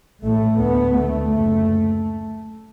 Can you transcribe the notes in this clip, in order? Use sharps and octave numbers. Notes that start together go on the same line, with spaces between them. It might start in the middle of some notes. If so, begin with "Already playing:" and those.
A1 A2 A3
D2 B3
D2 A3
F#1 F#2